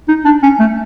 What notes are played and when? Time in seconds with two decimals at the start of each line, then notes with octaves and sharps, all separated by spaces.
0.08 D#4
0.25 D4
0.43 C#4
0.60 A3